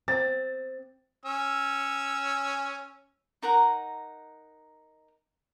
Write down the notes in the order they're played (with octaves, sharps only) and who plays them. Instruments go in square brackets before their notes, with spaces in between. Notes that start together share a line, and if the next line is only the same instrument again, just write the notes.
[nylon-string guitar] C4 [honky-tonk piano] A6
[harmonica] C#4 E6
[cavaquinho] D#4 A#4 F#5 A#5